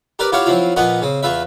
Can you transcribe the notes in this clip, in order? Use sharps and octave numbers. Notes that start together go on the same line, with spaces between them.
G4 A#4 B4 D5
E4 F4 G4 C#5 F5 F#5
F3 F#3 C4 E4 F4
A#2 F3 B3 F4 D#5 F#5
C#3 C4
E2 F4 B4 E5